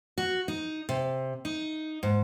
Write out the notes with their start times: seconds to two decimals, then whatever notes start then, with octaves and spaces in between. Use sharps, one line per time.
0.18 F#4
0.48 D#4
0.89 C3
1.45 D#4
2.03 G#2